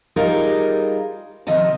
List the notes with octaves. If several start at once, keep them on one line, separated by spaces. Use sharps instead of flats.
G3 D#4 F4 G#4 A#4
C3 D#3 F3 D#5 A5